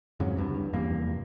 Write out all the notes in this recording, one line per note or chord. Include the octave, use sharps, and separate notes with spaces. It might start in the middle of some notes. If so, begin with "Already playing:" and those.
F2 G#2 C#3 F#3
D1 G2
F1 E2 G2 A#3